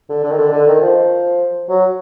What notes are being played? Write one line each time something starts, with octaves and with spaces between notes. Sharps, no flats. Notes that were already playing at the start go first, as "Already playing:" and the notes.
D3
D3
D#3
D3
D3
D#3
F3
F#3